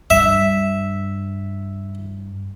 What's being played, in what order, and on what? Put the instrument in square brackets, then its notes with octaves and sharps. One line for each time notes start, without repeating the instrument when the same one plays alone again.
[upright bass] G2 [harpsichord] E5